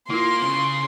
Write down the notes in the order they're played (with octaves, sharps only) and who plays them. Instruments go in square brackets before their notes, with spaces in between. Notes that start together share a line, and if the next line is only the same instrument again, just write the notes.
[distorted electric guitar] A#3 [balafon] E4 F4 [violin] C6
[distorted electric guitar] C#3